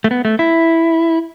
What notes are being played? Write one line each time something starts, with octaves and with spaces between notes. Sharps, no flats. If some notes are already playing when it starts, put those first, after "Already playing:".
A3
B3
A3
E4